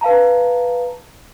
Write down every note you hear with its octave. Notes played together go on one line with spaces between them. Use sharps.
B4 F5 A5 A#5